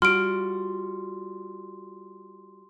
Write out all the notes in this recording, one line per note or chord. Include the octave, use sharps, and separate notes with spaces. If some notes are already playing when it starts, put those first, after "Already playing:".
G3 F4 F#4 C6 F6 D7